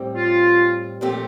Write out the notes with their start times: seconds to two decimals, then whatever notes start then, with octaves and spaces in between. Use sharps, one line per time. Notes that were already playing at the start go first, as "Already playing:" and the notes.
Already playing: A2 G3 C4 G4
0.15 F4
1.01 A#2 F3 A3 C4 G4